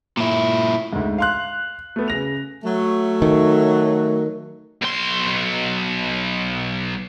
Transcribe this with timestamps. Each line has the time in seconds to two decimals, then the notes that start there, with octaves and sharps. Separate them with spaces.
0.17 A#2 E4
0.93 D2 G#2
1.18 F5 C6 F#6
1.96 A3 B3
2.08 C#3 A#6 F7
2.64 F#3 A3
3.22 D#3
4.82 B1 C6